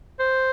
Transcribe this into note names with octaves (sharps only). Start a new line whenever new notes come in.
C5